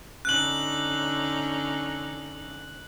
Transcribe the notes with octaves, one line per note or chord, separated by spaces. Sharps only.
D3 C#4 D#4 F#6 F#7